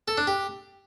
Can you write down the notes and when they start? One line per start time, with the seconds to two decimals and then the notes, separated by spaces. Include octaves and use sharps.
0.08 A4
0.18 D4
0.27 G4